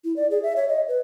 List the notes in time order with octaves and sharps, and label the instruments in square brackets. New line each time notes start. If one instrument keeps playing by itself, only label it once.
[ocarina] E4
D5
G#4
E5
C#5
D#5
B4